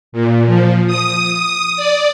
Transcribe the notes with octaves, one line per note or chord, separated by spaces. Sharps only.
A#2
F3
D#6
D#6
D5